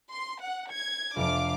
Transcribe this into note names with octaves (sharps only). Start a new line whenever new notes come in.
C6
F#5
G#6 C#7
F1 F2 F3 D4 F5 D6